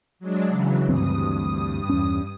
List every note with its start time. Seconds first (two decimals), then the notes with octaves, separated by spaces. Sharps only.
0.19 F#3 G#3 D4
0.49 C#3 E3 F#3
0.89 D2 G2 E3 C4 D#6
1.89 E2 C#4